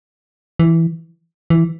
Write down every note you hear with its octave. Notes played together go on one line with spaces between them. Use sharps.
E3
E3